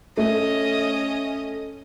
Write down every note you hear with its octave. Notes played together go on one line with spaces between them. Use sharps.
A3 C#4 D#5